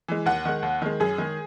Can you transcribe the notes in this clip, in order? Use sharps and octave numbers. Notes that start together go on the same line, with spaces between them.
E3 G#3
D#2 F#5
D#3 G#3
D#2
D#3 G#3
F#2 G#4
D#3 G#3